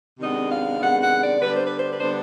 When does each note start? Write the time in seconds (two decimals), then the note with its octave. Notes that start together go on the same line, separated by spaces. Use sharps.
0.19 C3 D#3 G#3 B3 D4 D#5
0.50 F5
0.79 C3 D#3 G#3 B3 D4 F#5
1.00 F#5
1.20 D5
1.40 D3 G3 B3 D4 B4
1.52 C5
1.64 B4
1.75 C5
1.88 B4
2.00 D3 G3 B3 D4 C5